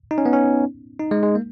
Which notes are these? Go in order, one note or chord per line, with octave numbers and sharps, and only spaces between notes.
D#4
C#4
B3
C#4
D#4
G#3
G#3
A#3